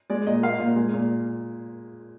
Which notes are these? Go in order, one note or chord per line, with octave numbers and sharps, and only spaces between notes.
G#3 D5
A#2 D#5
A#3 F5
A#2
G#3
A#2